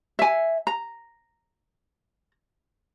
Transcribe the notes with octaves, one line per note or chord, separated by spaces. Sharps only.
E5 G#5
A#5